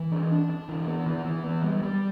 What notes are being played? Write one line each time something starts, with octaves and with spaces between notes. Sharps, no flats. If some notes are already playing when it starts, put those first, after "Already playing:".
Already playing: E3
D4
D4
D4
E3
B3
E3
E3
B3
G3
G3